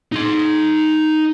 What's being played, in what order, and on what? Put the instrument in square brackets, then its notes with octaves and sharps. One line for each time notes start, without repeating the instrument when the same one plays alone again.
[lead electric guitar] D#4 C6